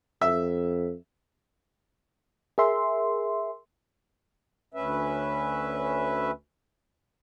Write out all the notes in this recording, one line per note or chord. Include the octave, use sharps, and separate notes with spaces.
F2 E5
G#4 A#4 E5 C6
D2 C#4 B4 E5